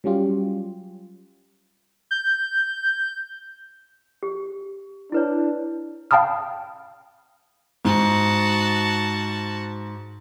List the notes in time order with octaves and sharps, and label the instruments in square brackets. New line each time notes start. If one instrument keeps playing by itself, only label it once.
[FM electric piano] F#3 G3 C#4 F4 G4
[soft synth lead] G6
[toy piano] G4
[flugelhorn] D4 [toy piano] E4 B4 C#5
[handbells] F5 G5 A5 B5 D#6 F6
[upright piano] G#2 [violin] F#4 A5